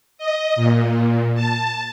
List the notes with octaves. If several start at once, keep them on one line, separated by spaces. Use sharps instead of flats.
D#5
A#2
A5